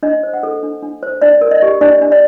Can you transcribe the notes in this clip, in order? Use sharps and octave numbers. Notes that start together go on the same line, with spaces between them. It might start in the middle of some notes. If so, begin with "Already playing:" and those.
D4 D#5
C5
F#5
A4
D4
D4
C5
D4 D5
A#4
D#5
G4
D4 D5
D4
D5